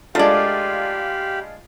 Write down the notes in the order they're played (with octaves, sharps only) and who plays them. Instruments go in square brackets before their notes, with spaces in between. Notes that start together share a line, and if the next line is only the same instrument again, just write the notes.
[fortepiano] G#3 D4 F4 [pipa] A3 D5 [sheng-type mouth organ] G4 F5 B5